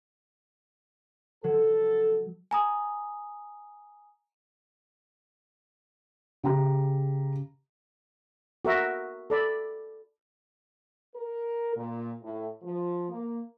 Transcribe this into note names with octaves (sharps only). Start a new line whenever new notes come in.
F#3 A4
G#5 A#5 D#6
C#3 G4 A#5
F#4 A#4 E5
A4 D5 B5
A#4
A#2
A2
F3
A#3